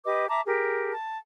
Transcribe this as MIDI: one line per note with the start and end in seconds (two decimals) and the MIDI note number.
0.05 0.27 67
0.05 0.27 71
0.05 0.27 75
0.05 0.27 86
0.29 0.40 76
0.29 0.40 81
0.29 0.40 82
0.29 0.40 86
0.46 0.91 67
0.46 0.91 68
0.46 0.91 70
0.92 1.17 81